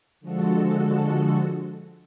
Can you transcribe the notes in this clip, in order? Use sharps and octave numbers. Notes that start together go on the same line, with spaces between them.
D3 F3 G#3 F#4 A4